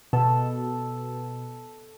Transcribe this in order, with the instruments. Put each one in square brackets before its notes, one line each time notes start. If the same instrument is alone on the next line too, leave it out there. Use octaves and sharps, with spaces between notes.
[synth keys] B2 [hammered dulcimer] A4